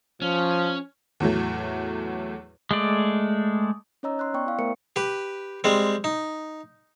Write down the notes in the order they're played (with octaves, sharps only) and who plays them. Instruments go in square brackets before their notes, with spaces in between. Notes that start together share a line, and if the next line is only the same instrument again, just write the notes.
[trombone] F3 [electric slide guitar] C#4
[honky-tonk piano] E2 A2 F#3 A3
[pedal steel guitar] G#3 A3 D5
[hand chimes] C#4 D#4 C#5 D#5 A#5 E6
C6 E6 F#6
B3 D5 G5 C#6
E4 F5
A3 B3 A#4 C5 E5 C#7
[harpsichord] G4 B4
G3 G#3 C4
D#4